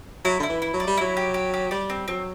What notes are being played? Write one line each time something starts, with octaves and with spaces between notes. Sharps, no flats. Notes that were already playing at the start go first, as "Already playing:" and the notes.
F#3 E4
D3 E4
E3
E4
F#3
D5
G3
F#3 E4
G4
G4
G4
G3 D5
C4
F#3 C4